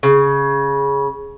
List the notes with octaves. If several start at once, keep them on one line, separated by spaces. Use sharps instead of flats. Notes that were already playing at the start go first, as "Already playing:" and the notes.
C#3